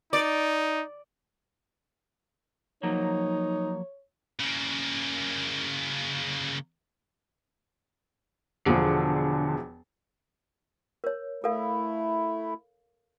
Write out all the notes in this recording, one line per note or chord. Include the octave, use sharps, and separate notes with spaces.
D#4 D5
F3 F#3 A#3 D#4 C#5
C#3 A#3
E1 E2 D3 F3
A#4 C#5
A3 E4 A4 A#4 F5